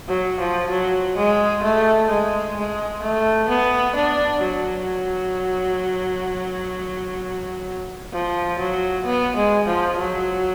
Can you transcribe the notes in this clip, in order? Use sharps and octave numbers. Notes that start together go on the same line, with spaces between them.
F#3
F3
F#3
G#3
A3
G#3
G#3
A3
B3
D4
F#3
F3
F#3
B3
G#3
F3
F#3